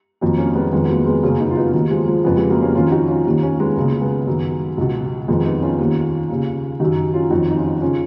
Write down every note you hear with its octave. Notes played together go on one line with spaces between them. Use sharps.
F2 D#3 F#3 A#3
A#3 C#4
G#3 B3
F2 D#3 G#3 B3
B3
F#3 A#3
G#3 B3
F#2 C#3 A#3 C#4
B3 D#4
F4
B3 D#4
D#2 D#3 F#3
F3 G#3
F3 G#3
F2 C#3 G#3 B3
G#3 B3
F#3 A#3
A#3 C#4
F2 D#3 C#4 F4
D#4 F#4
C#4 F4
D#2 D#3
A#3 C#4
G#3 B3
C#2 C#3 F#3 A#3
G#3 B3
F#2 D#3
C#2 B2
F2 D#3 G#3 B3
B3 D#4
C#4 F4
D#2 D#3
D#2 C#3
F#2 D#3 D#4 F#4
C#4 F4
F2 D#3 D#4 F#4
D#4
C#4 F4
C#3 C#4 F4